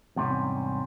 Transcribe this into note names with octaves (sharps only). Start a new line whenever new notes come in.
E2 G#2 C3 G3 C#4